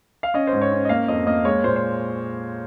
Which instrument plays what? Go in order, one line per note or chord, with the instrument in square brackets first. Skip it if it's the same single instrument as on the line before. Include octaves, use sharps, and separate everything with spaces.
[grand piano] F5
C#4 D#5
C5
G#2
C#5
C#4
D#5
A#3 F5
F2 D#5
A#3 D#5
G#3 C#5
A#2 C5
C5